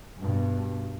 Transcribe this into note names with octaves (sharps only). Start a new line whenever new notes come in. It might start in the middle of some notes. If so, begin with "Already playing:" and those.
G2 B2